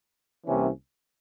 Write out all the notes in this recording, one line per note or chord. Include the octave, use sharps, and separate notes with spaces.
C2 C3 E3 A#3 C#4